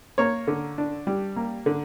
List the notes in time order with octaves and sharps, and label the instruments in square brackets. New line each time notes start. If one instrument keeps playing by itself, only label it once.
[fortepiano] A#3 C#5
D3
D4
G3
A#3
D3